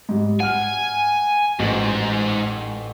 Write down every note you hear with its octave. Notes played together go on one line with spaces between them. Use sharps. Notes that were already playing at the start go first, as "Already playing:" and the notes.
G#2 G3
F#5 G#5 F6
A1 G#2 F#4 F#7